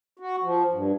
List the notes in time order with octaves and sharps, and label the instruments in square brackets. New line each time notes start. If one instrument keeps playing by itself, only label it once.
[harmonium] F#4
F3
G2